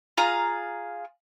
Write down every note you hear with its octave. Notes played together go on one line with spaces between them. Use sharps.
F4 G#4 F5 A#5